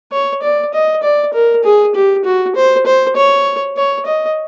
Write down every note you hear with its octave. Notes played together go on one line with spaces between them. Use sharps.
C#5
D5
D#5
D5
A#4
G#4
G4
F#4
C5
C5
C#5
C#5
D#5